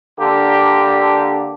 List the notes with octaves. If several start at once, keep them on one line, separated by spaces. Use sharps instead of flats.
D3 A#3 D4 G4